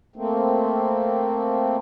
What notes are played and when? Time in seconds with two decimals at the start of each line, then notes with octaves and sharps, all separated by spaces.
0.16 A3 A#3 C4